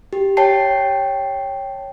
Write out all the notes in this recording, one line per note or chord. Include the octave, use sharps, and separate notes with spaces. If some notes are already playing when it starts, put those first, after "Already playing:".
G4
C#5 G5 A5 C7